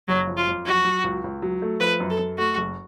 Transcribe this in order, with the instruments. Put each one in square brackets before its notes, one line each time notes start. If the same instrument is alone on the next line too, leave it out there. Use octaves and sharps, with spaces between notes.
[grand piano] F#1 [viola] F#3
[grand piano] F3
[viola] F4
[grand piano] F2
[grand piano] F#3 [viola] F#4
[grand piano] F#3
C#2
C#2
F#3
A3
[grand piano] F3 [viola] B4
[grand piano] F#2
[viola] A4
[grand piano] F#2
[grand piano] A3 [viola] F#4
[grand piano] F#1